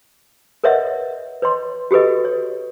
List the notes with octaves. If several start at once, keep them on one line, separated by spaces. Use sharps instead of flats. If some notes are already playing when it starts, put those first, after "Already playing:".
A#4 B4 C#5 D#5 E5 F#5
B4 C#5 D#5 C6
F#4 G4 A4 B4 D#5
C#5